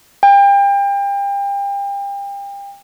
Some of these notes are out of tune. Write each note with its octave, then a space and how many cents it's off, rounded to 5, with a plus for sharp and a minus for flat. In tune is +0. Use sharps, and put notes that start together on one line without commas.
G5 +35